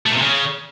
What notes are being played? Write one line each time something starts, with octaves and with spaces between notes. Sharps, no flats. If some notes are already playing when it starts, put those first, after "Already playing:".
A3
A#2
C3
C#3